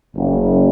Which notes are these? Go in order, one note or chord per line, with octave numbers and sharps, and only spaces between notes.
F#1